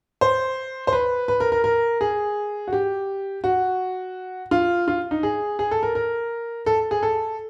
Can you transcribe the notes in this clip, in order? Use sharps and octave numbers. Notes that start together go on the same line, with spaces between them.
C5
C5
B4
B4
A#4
A#4
A#4
G#4
F#4
G4
F#4
F4
F4
D#4
G#4
G#4
A4
A#4
A#4
A4
G#4
A4